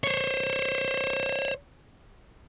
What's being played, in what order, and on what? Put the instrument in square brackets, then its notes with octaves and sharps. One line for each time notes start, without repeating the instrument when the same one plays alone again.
[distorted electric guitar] C5 C#5